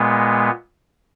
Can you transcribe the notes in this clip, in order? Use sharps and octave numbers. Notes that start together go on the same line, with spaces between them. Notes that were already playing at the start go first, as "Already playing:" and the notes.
Already playing: A#2 G#3 B3